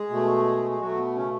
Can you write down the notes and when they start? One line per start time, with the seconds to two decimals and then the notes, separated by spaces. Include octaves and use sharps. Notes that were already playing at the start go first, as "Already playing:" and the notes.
Already playing: G#3 G#4
0.10 B2 A3
0.70 G#4
0.80 B2 F#3 A3 F#4
0.98 B3
1.15 C#3 C#4